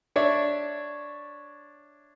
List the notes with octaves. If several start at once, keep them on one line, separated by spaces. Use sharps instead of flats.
D4 C#5 D5 E5